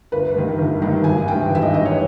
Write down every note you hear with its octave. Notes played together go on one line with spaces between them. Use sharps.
G1 B4
G2 D#3
G1
G2 D#3
G#1 G#5
G2 E3 G5
G#1 E5
D#5
G2 E3 D#5
C#5